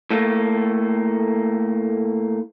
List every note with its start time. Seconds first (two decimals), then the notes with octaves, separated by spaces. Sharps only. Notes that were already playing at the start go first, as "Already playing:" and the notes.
0.11 A2 A3 A#3